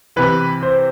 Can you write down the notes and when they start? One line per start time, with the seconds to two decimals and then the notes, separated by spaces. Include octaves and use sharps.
0.16 C3 E3 B4
0.63 C5